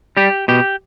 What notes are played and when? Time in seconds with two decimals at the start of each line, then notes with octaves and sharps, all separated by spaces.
0.17 G3 G4
0.48 B2 G4